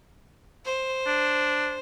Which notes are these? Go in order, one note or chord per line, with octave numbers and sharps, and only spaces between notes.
C5
D4